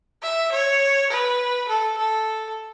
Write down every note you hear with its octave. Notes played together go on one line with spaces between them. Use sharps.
E5
C#5
B4
A4
A4